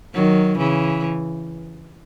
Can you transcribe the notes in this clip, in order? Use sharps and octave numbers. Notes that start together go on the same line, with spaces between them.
D#3 F#3
C#3 E3